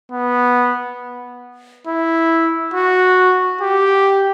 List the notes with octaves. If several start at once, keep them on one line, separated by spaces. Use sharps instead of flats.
B3
E4
F#4
G4